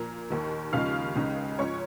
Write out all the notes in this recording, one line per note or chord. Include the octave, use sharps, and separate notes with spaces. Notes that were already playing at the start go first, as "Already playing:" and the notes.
Already playing: A#2 F3 A#3 A#4 A#5
D#2 D#3 A#3
D#2 C#3 F3 G#3 D#4 F5 F6
C#2 C#3 G#3 D#4
G#2 F3 C#4 C#5 C#6